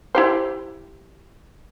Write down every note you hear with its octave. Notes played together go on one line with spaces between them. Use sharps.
E4 G4 C5